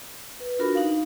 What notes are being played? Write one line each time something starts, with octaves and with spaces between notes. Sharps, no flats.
B4
D4 F4 F#4 A#4 B5
D#4 F5